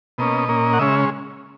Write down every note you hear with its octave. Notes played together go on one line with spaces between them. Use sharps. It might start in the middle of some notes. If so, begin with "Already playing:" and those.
B2 A#3 C#4 D#5
A#2 A#3 C#4
F#5
C#3 G#3 C#4 E5